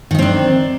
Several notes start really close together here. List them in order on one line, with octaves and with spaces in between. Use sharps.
D#3 D#4 C4 D4